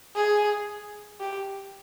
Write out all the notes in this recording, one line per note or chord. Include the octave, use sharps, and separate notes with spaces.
G#4
G4